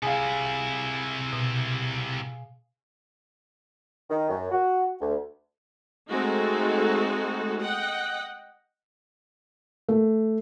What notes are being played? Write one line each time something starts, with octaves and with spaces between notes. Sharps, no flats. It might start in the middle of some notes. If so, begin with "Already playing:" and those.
C3 E4 G#4 F5
B2
D#3
F#2
F#4
D2
G#3 A3 C4 D#4 F#4 A4
D#5 F#5 G5
A3